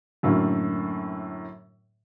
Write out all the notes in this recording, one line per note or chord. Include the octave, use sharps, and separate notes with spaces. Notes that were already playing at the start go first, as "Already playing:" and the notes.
F#2 A2 D3 A#3